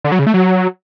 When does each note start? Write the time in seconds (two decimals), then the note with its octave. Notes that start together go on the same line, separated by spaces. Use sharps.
0.04 D3
0.12 F#3
0.19 C#3
0.27 A3
0.34 F#3